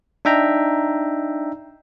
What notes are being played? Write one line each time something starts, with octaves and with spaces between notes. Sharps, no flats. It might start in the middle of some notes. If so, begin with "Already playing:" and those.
D4 D#4 E5 G5 A#5